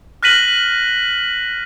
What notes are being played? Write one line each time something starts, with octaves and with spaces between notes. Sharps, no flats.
F6 F#6 A#6 B6 D#7 F#7